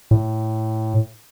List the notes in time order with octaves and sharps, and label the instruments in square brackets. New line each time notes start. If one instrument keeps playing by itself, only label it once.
[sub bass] A2